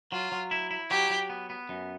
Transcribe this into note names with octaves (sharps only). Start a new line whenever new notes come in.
F#3 F4
F#3
E4
E4
F#3 G4
F#3
B3
B3
F#2